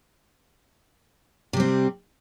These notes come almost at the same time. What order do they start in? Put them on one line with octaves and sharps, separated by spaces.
C3 G3 C4